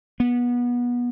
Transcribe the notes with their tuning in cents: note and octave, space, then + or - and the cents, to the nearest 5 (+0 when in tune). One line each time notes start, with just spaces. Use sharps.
B3 -25